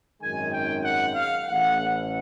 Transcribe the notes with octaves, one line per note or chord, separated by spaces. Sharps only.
G#1 F#2 D#3 G#3 G#5
G5
F#5
F5
A1 A2 E3 F#5